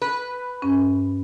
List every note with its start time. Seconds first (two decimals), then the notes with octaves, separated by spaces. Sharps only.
0.02 B4
0.62 G2 C#4